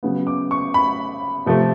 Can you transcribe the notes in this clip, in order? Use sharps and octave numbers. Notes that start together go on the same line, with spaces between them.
C#3 F#3 B3
D6
C#6
B5
C3 F3 A3